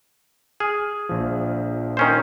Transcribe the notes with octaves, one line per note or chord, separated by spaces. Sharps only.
G#4 F6
A#1 F3
D#3 C#4 C5